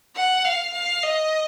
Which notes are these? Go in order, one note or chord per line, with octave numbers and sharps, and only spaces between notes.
F#5
F5
F5
D#5